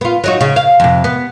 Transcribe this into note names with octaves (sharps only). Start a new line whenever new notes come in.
B3 F4
F#3 D#4 F#4
C#3
F5
F2 C3
B3